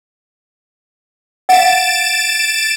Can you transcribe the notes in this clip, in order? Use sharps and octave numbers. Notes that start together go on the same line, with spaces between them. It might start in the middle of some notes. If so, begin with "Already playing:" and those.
F5 F#5 A6 D7 E7